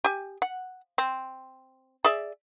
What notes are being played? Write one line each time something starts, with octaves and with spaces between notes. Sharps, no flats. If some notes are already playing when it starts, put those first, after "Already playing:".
G4 G#5
F#5
C4
G#4 D5 E5